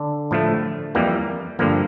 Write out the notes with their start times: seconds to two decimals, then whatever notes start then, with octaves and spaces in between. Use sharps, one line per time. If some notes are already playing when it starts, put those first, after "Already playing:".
Already playing: D3 D4
0.31 A2 F3 A3
0.95 F2 E3 G3 A#3
1.59 G2 D3 F3 A#3